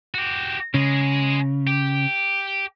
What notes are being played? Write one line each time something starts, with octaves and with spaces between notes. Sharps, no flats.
F#4 G4
C#3 G#3 G#4
G4